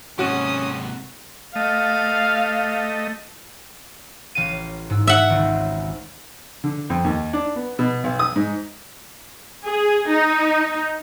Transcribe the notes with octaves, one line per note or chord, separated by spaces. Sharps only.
G#2 C3 C#4 F#4 D#6
A3 D#5 F5
A1 F5 D#7
G#2 E6
E5 F#5
G#1 C#2
D3
F2
D#2
D4
B3
B2
B1
D#6
G#2
G#4
D#4